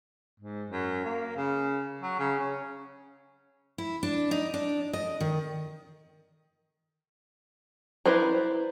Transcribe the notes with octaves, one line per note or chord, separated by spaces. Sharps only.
G#2
F#2
A#3
C#3
F#3
C#3
C#4
E4
D4
D#4
D4
D#5
D#3
E4 B4 C5 D5 A#5